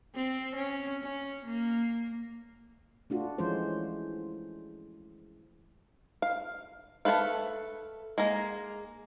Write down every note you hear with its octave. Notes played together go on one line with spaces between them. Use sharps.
C4
C#4
C#4
A#3
A3 D4 F4 F#4
E3 F3 G#3 C#4 C5
F5
A3 C#4 A4 B4 F5
G#3 A#3 A#5